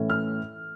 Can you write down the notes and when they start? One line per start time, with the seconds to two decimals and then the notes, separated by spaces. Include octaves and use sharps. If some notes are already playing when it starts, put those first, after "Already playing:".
Already playing: A2 E3 A3 C#4
0.10 F6